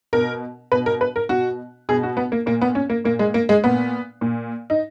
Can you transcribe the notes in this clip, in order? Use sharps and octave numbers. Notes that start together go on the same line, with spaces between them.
B2 A#4
B2 B4
A#4
B4
A#4
B2 F#4
B2 G#4
F#4
B3
A#3
A#2 A#3
B3
C#4
A#3
A#2 A#3
G#3
A#3
G#3
A#2 B3
A#2
D#4